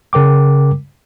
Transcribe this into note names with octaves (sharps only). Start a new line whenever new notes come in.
C#3 A#4 G5 D6